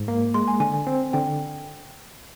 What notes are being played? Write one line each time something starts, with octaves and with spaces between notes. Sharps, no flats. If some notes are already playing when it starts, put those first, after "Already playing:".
Already playing: G#2
A#3
G#3 C6
G#5
D3 G#5
G#5
C4
D3 G5